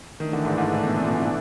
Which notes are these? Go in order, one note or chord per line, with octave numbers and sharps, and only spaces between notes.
D#3 E3 A3 D4
D3
G#2
G#2
A2
B2
C3
A#2
B2
B2